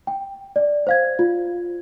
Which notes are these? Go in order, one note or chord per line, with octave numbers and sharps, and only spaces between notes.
G5
D5
C5 F5 G#6
F4